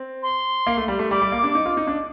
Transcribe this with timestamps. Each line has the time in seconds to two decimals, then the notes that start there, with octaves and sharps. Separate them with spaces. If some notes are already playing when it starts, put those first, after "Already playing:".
Already playing: C4
0.23 C6
0.67 A#3
0.77 A3
0.88 G3
0.99 A3
1.11 G3 D6
1.22 G3
1.32 A#3
1.44 D4
1.55 D#4
1.66 F4
1.77 D#4
1.87 D4